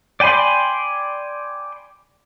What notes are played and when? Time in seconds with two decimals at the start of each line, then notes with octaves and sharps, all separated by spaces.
0.20 D5 G5 G#5 B5 C6